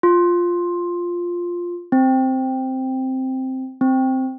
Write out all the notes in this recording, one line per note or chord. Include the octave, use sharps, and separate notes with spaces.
F4
C4
C4